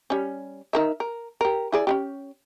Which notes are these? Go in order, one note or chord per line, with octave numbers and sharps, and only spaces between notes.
G3 C#4
D#4 A#4 E5
A#4
G4 A#4
E4 G#4 D5
C#4 D4 G4